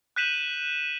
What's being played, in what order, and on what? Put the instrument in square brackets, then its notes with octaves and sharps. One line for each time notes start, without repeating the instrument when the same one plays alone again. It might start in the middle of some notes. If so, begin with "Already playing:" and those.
[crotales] F#6 G6 B6 D#7 E7 F#7